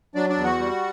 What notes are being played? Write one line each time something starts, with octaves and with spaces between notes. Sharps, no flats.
F#3 D4 D5
D4 D5
E2
F#4 F#5
G3